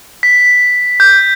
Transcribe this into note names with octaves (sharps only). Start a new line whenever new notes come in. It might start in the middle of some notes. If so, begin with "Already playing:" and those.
B6
G6